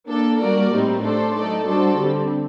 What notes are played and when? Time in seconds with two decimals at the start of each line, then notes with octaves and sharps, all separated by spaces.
0.08 A#3 D4 A4
0.40 G3 A#3 F#4 A#4 D5
0.71 A2 G3 C4 D#4
1.02 A3 D4 A4 C5
1.34 F#3 A3 D#4 A4 D5
1.66 G3 D4 F#4 A4 C5
1.97 D3 G3 C4